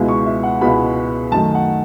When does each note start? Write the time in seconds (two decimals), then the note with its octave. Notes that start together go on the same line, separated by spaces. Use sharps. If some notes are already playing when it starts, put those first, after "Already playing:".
Already playing: C#2 B2 G#3 B3 E4
0.08 C#6
0.26 E5
0.43 F#5
0.61 C#2 B2 G#3 B3 E4 B5
1.32 F#2 D#3 A3 A5
1.55 F#5